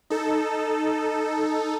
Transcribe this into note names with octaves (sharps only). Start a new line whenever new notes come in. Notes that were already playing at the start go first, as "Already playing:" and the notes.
D#4 A4